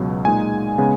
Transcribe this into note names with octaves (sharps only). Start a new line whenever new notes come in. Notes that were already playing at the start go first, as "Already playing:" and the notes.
Already playing: C#2 B2 F#3
A#2 G#3 D#4 G#5
C#3 G#3 B3